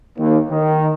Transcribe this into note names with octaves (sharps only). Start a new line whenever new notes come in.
D#2
D#3